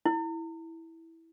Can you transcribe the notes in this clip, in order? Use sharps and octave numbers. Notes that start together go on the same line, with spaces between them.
E4